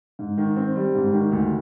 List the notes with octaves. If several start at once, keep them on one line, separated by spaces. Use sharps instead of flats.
G#2
D#3
C4
G3
G#2
D#3
D2